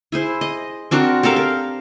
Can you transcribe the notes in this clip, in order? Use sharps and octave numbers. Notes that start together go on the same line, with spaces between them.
E4 G#4 C5
D#5
C4 D4 F#4 A#4
G4 A4 A#4 F5
A#4